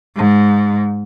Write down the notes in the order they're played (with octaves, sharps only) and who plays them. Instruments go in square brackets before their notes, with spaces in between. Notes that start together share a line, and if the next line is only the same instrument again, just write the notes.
[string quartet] G#2